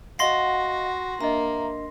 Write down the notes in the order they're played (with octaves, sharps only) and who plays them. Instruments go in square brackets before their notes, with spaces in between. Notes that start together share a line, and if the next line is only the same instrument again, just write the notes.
[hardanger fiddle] F#4 [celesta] D#5 F5 [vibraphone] F#5 [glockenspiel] C6 A#6 C7
[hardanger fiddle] A#3 [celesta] D4 D#5 [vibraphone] E5 A#5